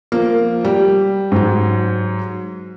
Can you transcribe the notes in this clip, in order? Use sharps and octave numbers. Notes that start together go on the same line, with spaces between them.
F3 A#3
G3
G#2 F#3